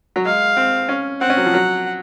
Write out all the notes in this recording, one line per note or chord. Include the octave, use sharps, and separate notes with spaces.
F#3
G#3 F5
C4
C#4
C4 F#5
C#4
F#3
F3
F#3